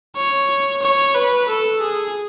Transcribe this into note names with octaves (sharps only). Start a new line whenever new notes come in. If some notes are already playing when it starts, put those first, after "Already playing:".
C#5
C#5
B4
A4
G#4